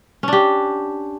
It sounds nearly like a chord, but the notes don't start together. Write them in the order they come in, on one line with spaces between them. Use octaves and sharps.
C#4 D4 G4